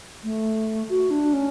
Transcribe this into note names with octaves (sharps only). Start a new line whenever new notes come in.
A3
F#4
D4
C#4